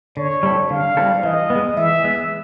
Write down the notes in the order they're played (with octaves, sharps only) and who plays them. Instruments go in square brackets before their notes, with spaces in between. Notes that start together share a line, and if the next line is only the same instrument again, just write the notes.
[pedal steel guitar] D3 [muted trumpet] C#5
[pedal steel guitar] G3 C4 E4 A4
[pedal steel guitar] D3 [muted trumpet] F5
[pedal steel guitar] G3 C4 E4 A4
[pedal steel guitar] E3 [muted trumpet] D#5
[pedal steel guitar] B3
G#3
[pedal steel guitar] E3 [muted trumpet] E5
[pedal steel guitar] G#3 B3